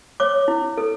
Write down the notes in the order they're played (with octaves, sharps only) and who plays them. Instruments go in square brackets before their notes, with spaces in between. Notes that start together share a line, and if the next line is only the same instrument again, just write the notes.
[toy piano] C#5 D6
E4
A4